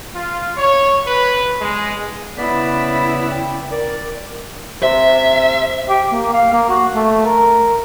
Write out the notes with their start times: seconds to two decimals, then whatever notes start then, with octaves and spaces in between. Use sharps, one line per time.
0.14 F4
0.56 C#5
1.07 B4
1.59 G#3
2.37 C#3 B3 C#4 E4 D5 B6
3.31 G5
3.71 A#4 D5
4.83 C3 E5
5.89 G4
6.12 A#3
6.33 F5
6.53 A#3
6.69 F#4
6.95 A3
7.25 A#4